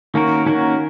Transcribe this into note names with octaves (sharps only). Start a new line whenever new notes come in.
D#3 A#3 C#4 F#4 A#4
D#3 A#3 C#4 F#4 A#4